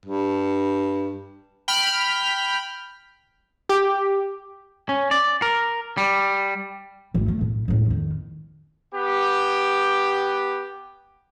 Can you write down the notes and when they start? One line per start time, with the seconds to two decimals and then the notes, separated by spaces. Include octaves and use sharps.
0.06 G2
1.68 G5 B5 F6
3.69 G4
4.89 C#4
5.11 D5
5.42 A#4
5.97 G3
7.14 G#1 A3
7.28 A3
7.41 A2
7.68 C#2 A2
7.87 F2 D#3
8.94 B3 G4